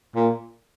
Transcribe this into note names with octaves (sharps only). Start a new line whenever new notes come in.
A#2